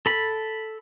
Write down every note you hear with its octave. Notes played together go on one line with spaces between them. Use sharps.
A4 B5